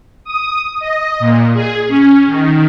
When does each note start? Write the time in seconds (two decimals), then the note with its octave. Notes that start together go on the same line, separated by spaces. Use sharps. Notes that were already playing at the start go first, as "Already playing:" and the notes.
0.24 D#6
0.79 D#5
1.20 A#2
1.53 G#4
1.88 C#4
2.27 D#3